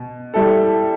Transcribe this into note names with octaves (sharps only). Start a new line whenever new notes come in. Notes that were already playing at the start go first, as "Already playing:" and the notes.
Already playing: B2
G3 E4 A4